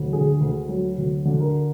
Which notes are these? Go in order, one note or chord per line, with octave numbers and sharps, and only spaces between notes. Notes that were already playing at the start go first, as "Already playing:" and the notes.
Already playing: D2 F#3
D3 G#4
D2
F#3
D2
D3
A#4